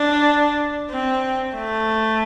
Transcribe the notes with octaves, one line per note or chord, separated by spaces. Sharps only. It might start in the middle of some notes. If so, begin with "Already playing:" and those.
Already playing: D4
C4
A3